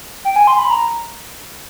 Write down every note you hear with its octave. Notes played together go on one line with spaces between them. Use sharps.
G5
G#5
C6
B5
A#5